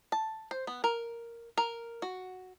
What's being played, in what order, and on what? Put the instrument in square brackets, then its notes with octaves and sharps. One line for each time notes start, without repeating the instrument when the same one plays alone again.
[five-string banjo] A5
C5
B3
A#4
A#4
F#4